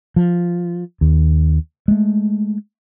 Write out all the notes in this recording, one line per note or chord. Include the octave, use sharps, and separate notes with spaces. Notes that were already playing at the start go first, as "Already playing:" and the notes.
F3
D#2
G#3 A3